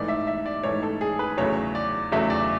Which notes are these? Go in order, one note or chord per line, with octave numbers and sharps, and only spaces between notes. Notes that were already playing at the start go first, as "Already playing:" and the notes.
Already playing: G#2 E3 A3 D5
E5
E5
D5
G#2 E3 A3 C#5
A4
G#4
B4
E2 C#3 F#3 A3 C#5
D5
E2 C#3 F#3 A3 E5
D5